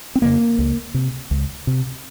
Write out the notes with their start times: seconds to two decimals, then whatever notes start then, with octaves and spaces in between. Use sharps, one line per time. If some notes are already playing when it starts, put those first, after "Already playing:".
0.15 C4
0.22 F2 C#3 A#3
0.59 C#2
0.94 C3
1.31 C#2
1.67 C3